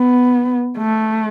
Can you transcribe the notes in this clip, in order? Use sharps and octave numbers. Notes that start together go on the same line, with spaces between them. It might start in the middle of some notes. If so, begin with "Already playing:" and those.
Already playing: B3
A3